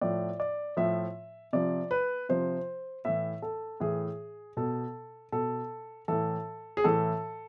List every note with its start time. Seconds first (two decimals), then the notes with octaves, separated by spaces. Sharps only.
0.01 A2 F3 D5
0.40 D5
0.77 A2 F3 E5
1.53 C3 F3 D5
1.91 B4
2.29 C3 F3 C5
3.05 A2 E3 E5
3.42 A4
3.80 A2 E3 G#4
4.57 B2 A4
5.32 B2 A4
6.08 A2 E3 A4
6.77 G#4
6.84 A2 E3 A4